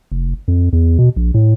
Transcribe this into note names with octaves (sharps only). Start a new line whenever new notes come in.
F1
F2
E2
B2
A#1
A2